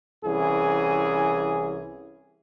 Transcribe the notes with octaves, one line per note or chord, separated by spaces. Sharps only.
C2 E3 C#4 G#4